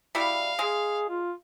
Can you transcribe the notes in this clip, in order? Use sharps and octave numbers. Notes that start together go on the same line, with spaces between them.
G3 E4 F#4 F5
G#3 G#4
F4